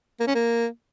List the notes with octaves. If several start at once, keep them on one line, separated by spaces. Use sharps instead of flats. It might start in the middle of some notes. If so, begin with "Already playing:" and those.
A#3
C#4
A#3